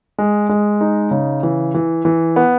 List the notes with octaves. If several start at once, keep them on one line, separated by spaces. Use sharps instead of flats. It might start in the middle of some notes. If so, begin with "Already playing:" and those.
G#3
G#3
D#4
C#3
E3
E3
E3
B3